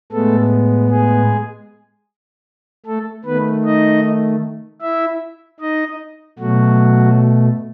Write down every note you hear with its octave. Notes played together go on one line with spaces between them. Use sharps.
A2 G#3 A3 B3 A4
G#3 G#4
A3 A4
D#3 A3 B3 B4
D#4 D#5
E4 E5
D#4 D#5
B2 F#3 A3 F#4